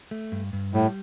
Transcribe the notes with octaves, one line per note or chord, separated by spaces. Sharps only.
A3
G2
G2
A2 G3